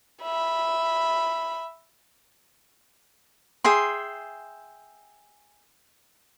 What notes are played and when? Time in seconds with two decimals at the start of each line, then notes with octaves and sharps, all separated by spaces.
0.22 E5 B5
3.64 G#4 E5 G5 C6